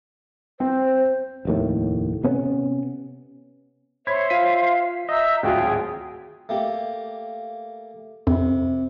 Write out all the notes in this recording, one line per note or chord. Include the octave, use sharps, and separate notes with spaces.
C4 C5
F1 D#2 A2
C3 B3 C#4
C5 C#5 E5 B5 G#6 B6
F4 F5 B6 D#7
D#5 E5 A#5 E6 G6
D1 G#1 F4 F#4 G#4 G5
A3 A#3 G4
F2 C3